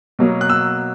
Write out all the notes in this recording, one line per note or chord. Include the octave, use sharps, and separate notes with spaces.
B2 F#3 A#3
F#6
E6